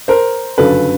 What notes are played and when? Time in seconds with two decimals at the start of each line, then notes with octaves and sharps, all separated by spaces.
0.08 A#4 C5
0.58 G1 F#2 C#3 F#3 A4 B4